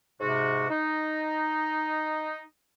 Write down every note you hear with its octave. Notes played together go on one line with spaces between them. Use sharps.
G#2 C3 F#4
D#4